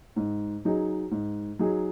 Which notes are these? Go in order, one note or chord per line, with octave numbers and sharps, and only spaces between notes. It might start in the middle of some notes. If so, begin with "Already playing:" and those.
G#2
F#3 D#4 G#4
G#2
F#3 D#4 G#4